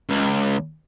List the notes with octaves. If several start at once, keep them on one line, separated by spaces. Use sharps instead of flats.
C#2